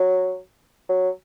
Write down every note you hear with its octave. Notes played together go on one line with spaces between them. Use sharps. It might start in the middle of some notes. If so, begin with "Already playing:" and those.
Already playing: F#3
F#3